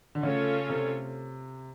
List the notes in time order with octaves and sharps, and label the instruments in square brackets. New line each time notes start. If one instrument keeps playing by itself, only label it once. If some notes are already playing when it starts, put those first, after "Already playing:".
[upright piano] D3
[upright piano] C#3 [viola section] A3 C#4 F4 A4 C#5
[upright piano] C3